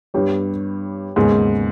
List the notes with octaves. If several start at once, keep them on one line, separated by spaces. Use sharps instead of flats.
G2 G3 B3 G4 C#5
D#2 G#2 C#3 G#3 B3